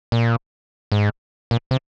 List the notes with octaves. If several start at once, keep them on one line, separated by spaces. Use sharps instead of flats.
A#2
G#2
A#2
C3